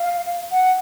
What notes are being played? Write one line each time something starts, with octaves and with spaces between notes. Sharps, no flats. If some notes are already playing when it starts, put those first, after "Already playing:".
Already playing: F5
F#5